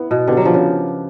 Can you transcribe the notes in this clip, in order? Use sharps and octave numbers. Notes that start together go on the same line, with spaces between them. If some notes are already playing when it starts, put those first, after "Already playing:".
Already playing: B3 E4
B2
D3 B3 D4 G4
F#3
F3
C#3